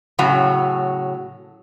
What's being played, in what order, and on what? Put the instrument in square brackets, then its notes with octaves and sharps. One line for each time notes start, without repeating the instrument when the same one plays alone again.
[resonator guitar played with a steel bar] A2 C#3 F#3 F#4